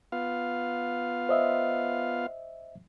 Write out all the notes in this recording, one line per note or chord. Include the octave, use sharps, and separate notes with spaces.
B3 F4 F5
C5 D#5 E5